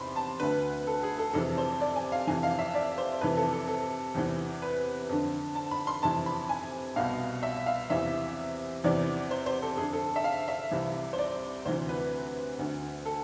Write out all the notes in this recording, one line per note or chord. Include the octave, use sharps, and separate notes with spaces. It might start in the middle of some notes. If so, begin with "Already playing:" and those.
Already playing: E2 C3 B5 C6
A5
D2 D3 B4
A4
G#4
A4
F2 C3 E3 A4
C5
D5
G#5
F5
F2 C3 E3 G#5
F5
E5
D5
C5
F2 C3 E3 B4
A4
A4
A4
E2 C3 E3
B4
F2 D3
A5
B5
C6
F2 C3 E3 A5
B5
G#5
C2 B2 F5
E5
F5
E2 C3 E3 E5
E2 C3 E3 D5
C5
C5
A4
F2 D3 G#4
A4
E5
F5
E5
C2 C3 E3
C5
D5
D2 C3 E3 C5
B4
D2 D3
A4